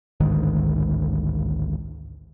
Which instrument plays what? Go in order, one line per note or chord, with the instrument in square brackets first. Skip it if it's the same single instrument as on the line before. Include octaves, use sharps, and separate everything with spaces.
[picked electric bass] A1 D2 G#2 D#3